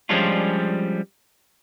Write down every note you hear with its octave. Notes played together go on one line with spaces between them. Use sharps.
F3 G3 G#3 C#4 D4 F4